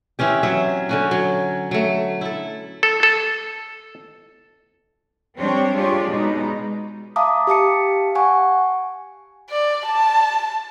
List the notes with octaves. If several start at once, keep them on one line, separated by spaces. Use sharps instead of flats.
E3 C4 C#4 G4
F#3 E5
D3 C#4 F#4
F#3
F#3 A3
E4 A4
A4
A4
G3 C4 D4 C5 C#5
D4 F4 G4 G#4 C#5 D5
B2 G#3 D#4
E5 F5 A5 A#5 D6 D#6
G4 F5 A5 C#7
F#5 G#5 C#6
D5
A5